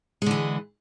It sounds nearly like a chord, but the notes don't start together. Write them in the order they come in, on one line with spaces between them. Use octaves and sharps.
G#3 D3 E3